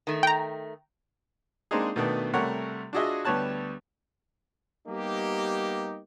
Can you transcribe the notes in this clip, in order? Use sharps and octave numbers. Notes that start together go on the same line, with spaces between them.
D#3 A3
G5 A#5
G#3 A#3 C4 D4 D#4 G#4
B2 D#3 A3 B3 D4
C3 G3 A3 A#4 C#5 F#5
D4 F4 F#4 G#4 D#5 E5
D2 G3 B3 C#5 A5 F#6
G3 A#3 B3 D#4 G4